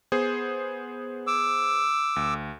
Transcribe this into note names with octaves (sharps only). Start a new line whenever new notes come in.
B3 G#4 C5
D6 E6
D2